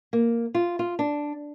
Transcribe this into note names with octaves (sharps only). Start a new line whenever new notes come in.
A#3
F4
F4
D4